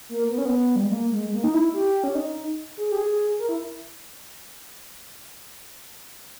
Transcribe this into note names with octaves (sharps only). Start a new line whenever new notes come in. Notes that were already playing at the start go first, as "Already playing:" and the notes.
A#3
B3
C#4
B3
G3
G#3
A#3
G#3
A#3
D#4
E4
G4
C#4
D#4
G#4
G4
G#4
A#4
E4